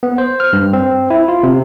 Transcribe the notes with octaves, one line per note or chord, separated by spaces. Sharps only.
B3
C5
F6
G2
C4
E4
F4
C3